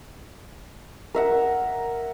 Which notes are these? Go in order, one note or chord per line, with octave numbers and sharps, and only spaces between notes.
A#4 E5 F#5